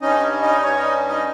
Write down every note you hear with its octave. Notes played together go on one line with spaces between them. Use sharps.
G2 G3 C#4 D#4 D#5
D#4 D#5
G2 G3 C#4 C#5
D#4 D#5
D#4 D#5